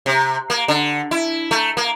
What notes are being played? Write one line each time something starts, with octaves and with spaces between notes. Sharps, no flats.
C3
A#3
D3
E4
A3
A#3